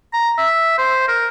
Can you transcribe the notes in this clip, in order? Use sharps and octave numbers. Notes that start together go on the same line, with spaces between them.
A#5
E5
C5
A#4